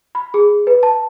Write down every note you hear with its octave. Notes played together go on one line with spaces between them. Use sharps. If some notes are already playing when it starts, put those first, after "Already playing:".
B5
G#4
B4
A5